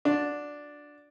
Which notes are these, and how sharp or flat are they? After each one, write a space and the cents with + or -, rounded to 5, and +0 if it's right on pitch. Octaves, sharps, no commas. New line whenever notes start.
D4 +0 F#4 -30